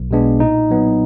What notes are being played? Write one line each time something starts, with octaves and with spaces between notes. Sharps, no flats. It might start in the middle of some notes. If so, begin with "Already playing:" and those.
Already playing: B1
B2 G#3 B3 D4
A#2 D#4
F#3 B3